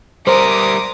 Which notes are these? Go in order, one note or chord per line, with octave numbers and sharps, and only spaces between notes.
G3 A#4 C5 A#5 D6 D#6